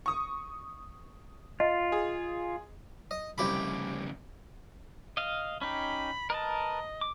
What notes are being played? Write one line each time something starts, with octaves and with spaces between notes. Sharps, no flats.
C#6 D#6
F4 D#5
G#4
D#5
C2 F2 C#3 G4 B5
D#5 F5
C#4 D#4 G4 B5
A#4 B4 D#5 A5
D6